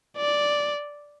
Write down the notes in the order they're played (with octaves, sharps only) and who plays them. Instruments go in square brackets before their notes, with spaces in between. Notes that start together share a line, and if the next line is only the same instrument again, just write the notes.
[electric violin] D5